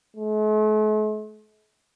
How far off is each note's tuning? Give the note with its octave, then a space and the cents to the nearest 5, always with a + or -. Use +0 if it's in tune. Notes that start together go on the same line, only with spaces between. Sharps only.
A3 -45